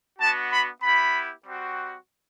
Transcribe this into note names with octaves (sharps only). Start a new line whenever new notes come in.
B3 D4 F#4 A5
B5
B3 E4 G4 B5
G3 C4 F#4